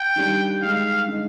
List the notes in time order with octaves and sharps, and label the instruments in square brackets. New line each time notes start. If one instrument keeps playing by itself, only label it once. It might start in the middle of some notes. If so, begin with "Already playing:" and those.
Already playing: [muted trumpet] G5
[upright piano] D#3 G3 D4
[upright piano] D#3 G#3 D#4 [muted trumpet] F5
[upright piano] D3 G#3 D#4